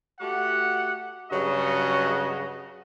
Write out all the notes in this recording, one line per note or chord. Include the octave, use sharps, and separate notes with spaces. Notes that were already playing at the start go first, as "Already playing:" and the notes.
A3 F#4 G4 F#5
G2 C#3 F#3 F#4 D#5